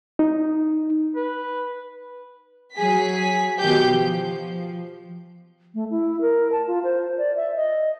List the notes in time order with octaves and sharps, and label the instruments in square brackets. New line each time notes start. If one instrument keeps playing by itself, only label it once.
[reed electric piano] D#4
[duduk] B4
[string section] F#3 G#4 B6
B2 D#3 G4 G6
F3
[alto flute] A3
E4
A#4
A5
F4
C5
D5
E5
D#5